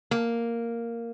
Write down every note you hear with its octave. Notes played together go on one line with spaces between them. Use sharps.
A#3